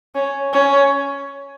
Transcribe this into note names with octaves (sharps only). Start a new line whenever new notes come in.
C#4
C#4